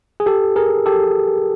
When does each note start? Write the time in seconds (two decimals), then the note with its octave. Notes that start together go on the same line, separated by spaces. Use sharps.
0.20 G#4
0.26 G4 A4
0.56 G#4 A#4
0.86 G4 A4